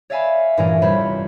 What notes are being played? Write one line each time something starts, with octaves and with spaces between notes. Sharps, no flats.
C#5 D5 E5 F5 G#5 B5
G2 A#2 E3 A3 C#4 A#4
F1 G3 C5 C#5 B5